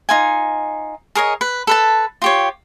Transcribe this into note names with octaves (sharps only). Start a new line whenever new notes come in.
D#4 F4 G#5
G#4 A#4 C#5 D#5
B4
A4 B4 A5
F4 G4 C#5